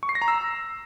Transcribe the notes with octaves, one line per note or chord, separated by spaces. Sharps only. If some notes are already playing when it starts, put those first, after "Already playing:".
C#6
C7
A#6
A#5
E6